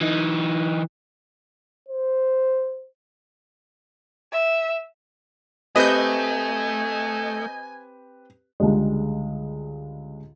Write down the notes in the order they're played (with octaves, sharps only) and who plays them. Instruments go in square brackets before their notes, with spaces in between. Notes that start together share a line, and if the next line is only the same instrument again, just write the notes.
[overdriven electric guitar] E3 D#4
[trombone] C5
[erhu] E5
[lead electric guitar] A3 [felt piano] C4 G4 B4 [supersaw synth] D#5 G6 [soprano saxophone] G#5
[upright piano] C#2 D3 G3 G#3